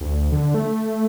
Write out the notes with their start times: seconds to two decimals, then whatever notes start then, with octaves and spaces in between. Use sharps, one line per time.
0.01 D2
0.32 D3
0.54 A3